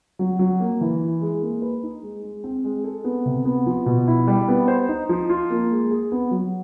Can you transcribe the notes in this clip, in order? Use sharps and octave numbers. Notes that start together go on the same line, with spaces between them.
F#3
F#3
A#3
E3
E4
G#3
A#3
B4
D#4
G#3
G#3
C4
G#3
A4
B3
C3
B3
F3
B2
E4
G3
B3
C5
D#4
F3
F4
A#3
G#3
G#4
B3
F#3